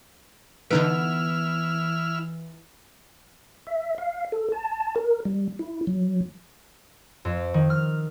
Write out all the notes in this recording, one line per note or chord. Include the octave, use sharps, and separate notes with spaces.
D3 E3 B3 D#4 E4 F6 D7
E5
F5
A4
A5
A#4
G3
E4
F#3
F2
D#3
F6